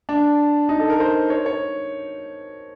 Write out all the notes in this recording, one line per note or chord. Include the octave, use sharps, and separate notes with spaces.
D4
D#4
A4
A#4
C5
C#5
C#5